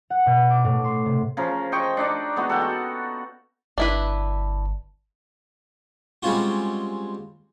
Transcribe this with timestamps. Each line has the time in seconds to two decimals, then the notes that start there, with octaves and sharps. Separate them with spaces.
0.10 F#5
0.26 B2
0.50 D6
0.65 A2
0.84 C6
1.06 C3
1.37 C#3 F3 A#4
1.72 C5 D#5 G5 C#6
1.97 D4 D#4 D5
2.36 G#3 B3 D#4 F#4
2.49 A4 F#5 G5
2.61 F#4
3.78 G1 D4 E4 B4
6.23 G3 G#3 C4 C#4 F4 F#4